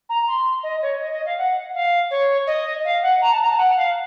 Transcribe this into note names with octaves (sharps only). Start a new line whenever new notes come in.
A#5
C6
D#5
C#5
D#5
D#5
F5
F#5
F5
C#5
D#5
F5
F#5
A#5
A5
A#5
A5
F#5
F5